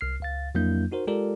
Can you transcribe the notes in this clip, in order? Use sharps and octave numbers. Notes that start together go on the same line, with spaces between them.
C2 F6 C7
C#2 F5 A6
F2 F#3 A#3 D4 E4 G6
D#4 F#4 A#4 C5
G#3 F4 G4 A4 A#4 D5